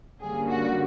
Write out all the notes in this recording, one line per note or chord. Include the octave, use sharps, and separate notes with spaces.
G2 D3 G3 A#3 C#4 G#4
F#4